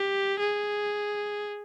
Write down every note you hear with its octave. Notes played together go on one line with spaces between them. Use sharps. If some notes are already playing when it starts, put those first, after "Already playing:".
Already playing: G4
G#4